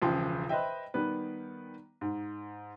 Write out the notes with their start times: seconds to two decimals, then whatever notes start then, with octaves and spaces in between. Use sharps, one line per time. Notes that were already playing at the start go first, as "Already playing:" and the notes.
0.02 E1 C#2 F3 G5 C6
0.49 B4 C5 D#5 E5 G5
0.94 D#3 G3 B3 B4
2.01 G#2